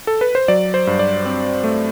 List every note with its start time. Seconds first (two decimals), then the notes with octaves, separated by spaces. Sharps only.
0.07 A4
0.21 B4
0.35 C5
0.48 F#3 D5
0.74 C5
0.87 G2
0.99 D5
1.25 C4
1.64 A3